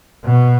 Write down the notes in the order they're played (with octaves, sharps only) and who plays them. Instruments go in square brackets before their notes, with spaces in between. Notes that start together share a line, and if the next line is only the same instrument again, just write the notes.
[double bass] B2